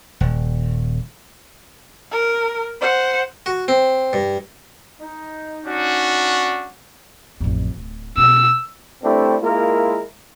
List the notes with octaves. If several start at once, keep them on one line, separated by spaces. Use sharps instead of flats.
D#1
A#4
C5 F#5
F#4
C4
G2
D#4
C#4 D4 F#4
A1 F2
D1
B2 E6
G2 A3 C4 D4 E4
G#3 A#3 E4 F4 A#4